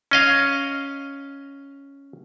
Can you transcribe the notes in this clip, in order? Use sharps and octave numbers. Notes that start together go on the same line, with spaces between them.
C#4 D#5 F5